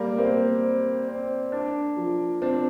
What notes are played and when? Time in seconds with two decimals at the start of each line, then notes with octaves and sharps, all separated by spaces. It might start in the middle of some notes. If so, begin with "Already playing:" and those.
Already playing: G3 A#3
0.18 A#3 C4
0.63 C4
1.08 C4
1.52 D4
1.97 F3
2.42 C4 D4